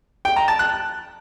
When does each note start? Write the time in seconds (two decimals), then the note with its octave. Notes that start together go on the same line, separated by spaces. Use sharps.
0.25 G5
0.36 A#5
0.48 A5
0.59 F#6